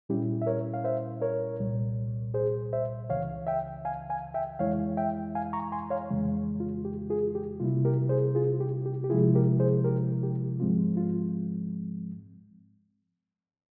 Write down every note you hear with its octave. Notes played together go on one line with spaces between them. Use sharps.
A#2 G3 C#4 E4 G4
E5
A#4 C#5
F5
C5 E5
A#4 C#5
C2 A#2 G3
G#4 C5
C5 E5
C#2 C#3 E3 C#5 F5
E5 G5
F5 G#5
F5 G#5
E5 G5
F2 E3 G#3 E4 C#5 F5
E5 G5
F5 G#5
A#5 C#6
G#5 C6
C#5 F5
F2 C#3 E3 G#3
F4
G4
F4 G#4
G4
C3 G3 A#3 E4 F4
G4 A#4
G#4 C5
F4 G#4
G4
G4
G4
C3 F3 G#3 E4 F4 G#4
G4 A#4
G#4 C5
G4 A#4
G4
G#2 F3 G#3 C4 F4
F4